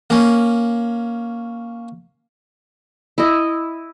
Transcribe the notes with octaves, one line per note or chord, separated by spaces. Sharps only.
A#3 C#4
E4 D#5